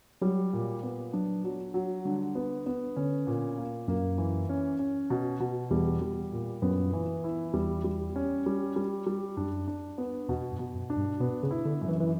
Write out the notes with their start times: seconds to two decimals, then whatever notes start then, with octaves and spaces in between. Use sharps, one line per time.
0.22 F#3 G3
0.53 A#2
0.83 B3
1.13 F#3 D4
1.44 F#3
1.74 F#3
2.05 D3 G3
2.35 B3
2.66 B3
2.96 D3 C#4
3.27 A#2
3.58 A#3
3.88 F#2 A#3
4.18 E3
4.49 C#4
4.79 C#4
5.10 B2
5.40 B2
5.71 E2 G3
6.01 G3
6.32 A#2
6.62 F#2 B3
6.93 E3
7.24 E4
7.54 E2 G3
7.84 G3
8.16 C#4
8.46 G3
8.76 G3
9.06 G3
9.37 F#2 D4
9.68 D4
9.98 B3
10.29 E2 B2
10.51 F#2
10.59 B2
10.74 F#2
10.90 D4
10.97 G2
11.20 B2 B3
11.43 C#3
11.51 E4
11.65 D3
11.81 F#2
11.89 E3
12.00 E3